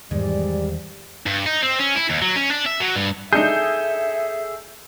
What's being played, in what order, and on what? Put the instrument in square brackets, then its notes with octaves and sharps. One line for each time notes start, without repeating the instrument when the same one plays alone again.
[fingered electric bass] E2 D#3 E3 [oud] G#2 [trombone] G3 [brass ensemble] G#4 D5
[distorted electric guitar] G2
D#4
C4
C#4
E4
D#2
F#3
C#4
D4
E5
F#3
G2
[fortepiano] G#3 D4 D#4 [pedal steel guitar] G#4 A4 [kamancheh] E5 [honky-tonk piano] G6